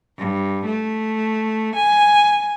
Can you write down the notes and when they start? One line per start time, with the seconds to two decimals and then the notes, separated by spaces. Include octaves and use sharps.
0.17 G2
0.66 A3
1.76 G#5